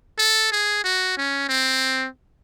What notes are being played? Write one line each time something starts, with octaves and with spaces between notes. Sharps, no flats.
A4
G#4
F#4
C#4
C4